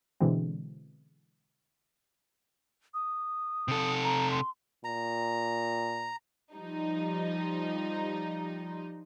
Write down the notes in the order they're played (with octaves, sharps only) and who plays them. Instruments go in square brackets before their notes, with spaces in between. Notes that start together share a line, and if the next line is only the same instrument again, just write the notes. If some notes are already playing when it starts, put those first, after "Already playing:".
[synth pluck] B2 D3 E3 G#3 C4
[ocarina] D#6
[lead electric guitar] C3 A4
[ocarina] A#5
C6
[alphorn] A#2 [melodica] A#5
[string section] F3 G3 D#4